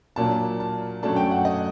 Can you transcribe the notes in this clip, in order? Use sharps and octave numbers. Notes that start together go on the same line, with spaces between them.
A#2 F#3 A#3 D4 A5
A5
F#2 F#3 A3 D4 A5
G5
F#5
D#5